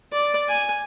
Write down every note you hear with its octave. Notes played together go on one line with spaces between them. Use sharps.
D5
G#5